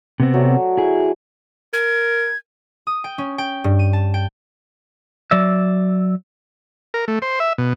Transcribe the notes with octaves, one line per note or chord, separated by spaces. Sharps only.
C3 B3 C4
F#3 A3 D5
E4 G#4
A#4 G#6
D#6
G5
C#4
G5
G2
D#7
A5
G5
F#3 D5 E5
A#4
A3
C5
E5
B2